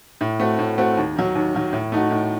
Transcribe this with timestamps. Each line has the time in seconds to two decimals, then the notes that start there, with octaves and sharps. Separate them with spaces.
0.21 A2
0.40 A3 C4 F#4
0.59 A2
0.78 A3 C4 F#4
0.97 D#2
1.16 D#3 F#3
1.35 D#2
1.54 D#3 F#3
1.73 A2
1.92 A3 D#4 F#4
2.11 A2